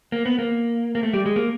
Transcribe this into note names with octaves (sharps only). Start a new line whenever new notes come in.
A#3
B3
A#3
A#3
A3
G3
G#3
A#3